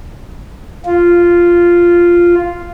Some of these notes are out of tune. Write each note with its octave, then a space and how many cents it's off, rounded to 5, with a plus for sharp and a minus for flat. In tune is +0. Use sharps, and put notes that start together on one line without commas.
F4 -5